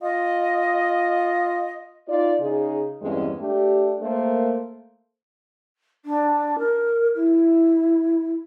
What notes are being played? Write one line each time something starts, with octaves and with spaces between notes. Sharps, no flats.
F4 D#5
D#4 F4 D5
C#3 D#4 G#4
E2 G2 G#3 C4 C#4
A3 D4 G4
A3 A#3 A#4 C5
D4
A#4
E4